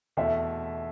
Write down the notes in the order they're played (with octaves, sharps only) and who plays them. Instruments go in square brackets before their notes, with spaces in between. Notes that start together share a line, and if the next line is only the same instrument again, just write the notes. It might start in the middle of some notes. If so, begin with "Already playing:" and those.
[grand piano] E2 B2 A3 [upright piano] E5